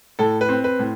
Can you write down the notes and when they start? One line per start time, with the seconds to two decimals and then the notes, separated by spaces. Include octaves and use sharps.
0.19 A2 A4
0.41 B4
0.49 C4
0.64 B4
0.79 A2